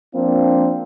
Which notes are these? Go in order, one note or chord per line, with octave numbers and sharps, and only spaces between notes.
F3 A#3 C4 D4 F4